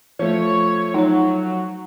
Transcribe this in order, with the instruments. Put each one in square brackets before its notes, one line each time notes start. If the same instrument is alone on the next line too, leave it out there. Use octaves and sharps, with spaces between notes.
[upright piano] F3 A3 [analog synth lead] C#5
[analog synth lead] F#3 [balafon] D#4 C#5